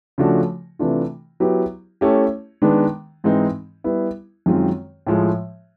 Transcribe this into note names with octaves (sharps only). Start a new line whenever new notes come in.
C#3 F3 A3 D4 F#4
C3 E3 A3 D4 F4
F#3 B3 E4 G4
A3 C#4 E4 G4
D#3 G#3 B3 D4
G#2 E3 G#3 C4 D#4
G3 B3 E4
F#2 D#3 G#3 C4 F4
A2 F3 G#3